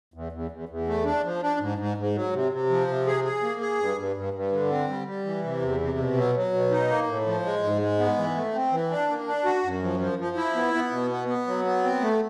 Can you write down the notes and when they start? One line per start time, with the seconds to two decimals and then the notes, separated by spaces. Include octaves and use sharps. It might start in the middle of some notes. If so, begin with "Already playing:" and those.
0.14 E2
0.32 E2
0.51 E2
0.69 E2
0.88 A3
1.05 D4
1.24 F3
1.42 D4
1.60 G#2
1.78 G#2
1.97 G#2
2.15 F#3
2.33 C3
2.52 C3
2.70 F3
2.87 C3
3.07 G#4
3.24 G#4
3.42 A#3
3.60 G#4
3.79 G2
3.97 G2
4.16 G2
4.34 G2
4.52 D3
4.70 C4
4.89 G3
5.07 G3
5.25 E3
5.44 C3
5.62 E2
5.80 C3
5.98 B2
6.17 F#3
6.35 F#3
6.54 B2
6.71 D#4
6.89 A#3
7.08 A2
7.26 F3
7.45 G#3
7.63 G#2
7.82 G#3
7.99 B3
8.18 E3
8.36 A3
8.54 C4
8.72 E3
8.91 D4
9.09 A#3
9.27 D4
9.45 F#4
9.64 F#2
9.83 F3
10.00 F3
10.19 F3
10.36 E4
10.55 B3
10.74 B3
10.91 B2
11.11 B3
11.28 B3
11.47 F#3
11.65 B3
11.83 C4
12.01 A3